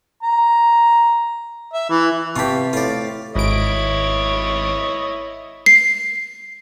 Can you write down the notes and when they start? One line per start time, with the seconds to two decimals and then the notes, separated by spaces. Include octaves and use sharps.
0.23 A#5
1.73 E5
1.90 E3
2.36 C3 F4 G4 B4 A5 C#6
2.73 A2 F4 D5
3.35 G#1 E4 C#5 D#5 D7
5.66 C7